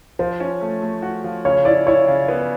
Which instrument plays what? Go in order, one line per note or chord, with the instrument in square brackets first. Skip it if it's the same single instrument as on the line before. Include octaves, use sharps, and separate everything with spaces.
[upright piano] F3 [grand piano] C5
[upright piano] C#4
A3
A3
F#4
F3
[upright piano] C#3 [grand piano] C#5
[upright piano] E4 [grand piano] D5
[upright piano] E4 [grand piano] C#5
[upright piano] C#3
B3